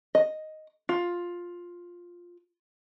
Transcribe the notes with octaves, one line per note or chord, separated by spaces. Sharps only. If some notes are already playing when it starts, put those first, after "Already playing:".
D#5
F4